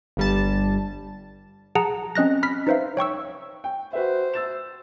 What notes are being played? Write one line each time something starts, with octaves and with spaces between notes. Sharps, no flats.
G1 G3 A5
G#4 F#5 A5 A#5
C4 C#4 D#5 F#6 A#6
B5 F6 B6
D#4 B4 C5 E5 F5
C#5 G5 C#6 E6
G5
F#4 B4 C5 E5
E6 A6 E7